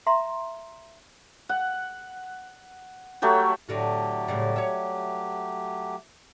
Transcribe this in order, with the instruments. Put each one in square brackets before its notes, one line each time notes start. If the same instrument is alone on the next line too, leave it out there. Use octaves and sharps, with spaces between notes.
[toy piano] E5 A#5 C6
[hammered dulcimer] F#5
F#3 A3 G4 C#5
[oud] A2 D3 F#4 [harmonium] F#3 A3 G4
[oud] A2 C#3 G3
C#5 E5